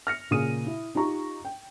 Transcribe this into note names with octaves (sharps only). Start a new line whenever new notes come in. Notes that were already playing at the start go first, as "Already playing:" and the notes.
F6 A#6 C#7
A#2 C#3 G#4 D#6 D#7
E4
D#4 F4 G4 A#5 C#6
G5